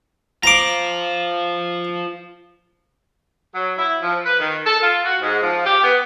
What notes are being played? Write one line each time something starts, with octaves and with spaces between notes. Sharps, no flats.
F4 C5 A#5 D6
F#3
E4
F3
B4
D#3
A4
F4
F#4
G#2
F3
G4
B3